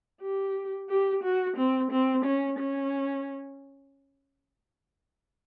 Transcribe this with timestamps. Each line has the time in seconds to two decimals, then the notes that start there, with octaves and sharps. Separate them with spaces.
0.21 G4
0.89 G4
1.23 F#4
1.57 C4
1.91 C4
2.25 C#4
2.59 C#4